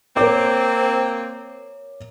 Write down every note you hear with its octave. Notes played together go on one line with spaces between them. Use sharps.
A#3 C4 A#4 C#5 D6